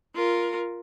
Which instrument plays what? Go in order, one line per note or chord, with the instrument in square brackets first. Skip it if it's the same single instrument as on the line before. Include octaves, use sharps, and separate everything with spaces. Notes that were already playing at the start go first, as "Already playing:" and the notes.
[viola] F4 A#4